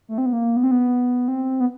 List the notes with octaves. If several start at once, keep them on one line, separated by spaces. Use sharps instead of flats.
A3
C4
B3
A#3
B3
C4
B3
C4
B3